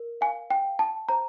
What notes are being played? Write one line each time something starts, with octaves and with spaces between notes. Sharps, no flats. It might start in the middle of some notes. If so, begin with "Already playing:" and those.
Already playing: A#4
F5 G#5
G5
F5
A5
C5 A#5